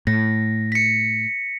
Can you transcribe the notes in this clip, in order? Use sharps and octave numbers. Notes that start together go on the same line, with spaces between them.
A2 A#6
B6 C#7